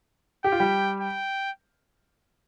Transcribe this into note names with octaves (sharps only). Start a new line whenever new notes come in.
G4 G5
F4
G3 G4
G5